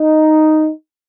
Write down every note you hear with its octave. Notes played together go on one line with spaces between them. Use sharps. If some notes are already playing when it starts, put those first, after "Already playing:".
Already playing: D#4